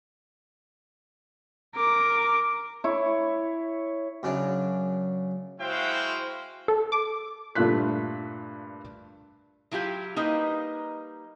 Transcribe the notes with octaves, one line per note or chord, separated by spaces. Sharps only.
A#4 D6
E4 C#5
F#2 C#3 D4
G#3 E4 F#4 C5 F5 G5
A4
D6
G2 A#2 A3 F4 F#6 B6
F#3 E4 F4 G4 F5
G3 A#3 D#4 B4 D#5